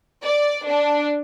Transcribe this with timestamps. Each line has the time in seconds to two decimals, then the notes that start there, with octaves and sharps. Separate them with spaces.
0.24 D5
0.67 D4